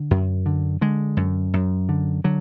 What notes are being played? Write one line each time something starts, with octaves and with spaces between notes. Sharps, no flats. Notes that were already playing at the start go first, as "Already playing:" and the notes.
Already playing: D3
F#2
D3
D3 G#3
F#2
F#2
D3
D3 F#3